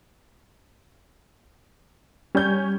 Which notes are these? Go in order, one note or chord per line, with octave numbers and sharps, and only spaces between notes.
G3 C#4 G6